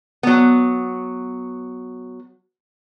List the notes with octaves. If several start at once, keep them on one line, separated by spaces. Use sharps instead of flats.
F#3 B3